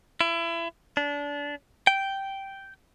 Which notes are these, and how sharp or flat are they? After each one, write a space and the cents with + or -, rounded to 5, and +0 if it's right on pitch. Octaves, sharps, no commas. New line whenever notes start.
E4 +30
D4 -25
G5 -5